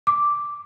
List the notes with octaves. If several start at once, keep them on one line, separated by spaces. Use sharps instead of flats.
D6